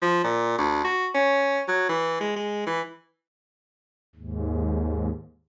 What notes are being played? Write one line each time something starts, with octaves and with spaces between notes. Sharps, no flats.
F3
A#2
D2
F#4
C#4
F#3
E3
G#3
G#3
E3
D#2 G#2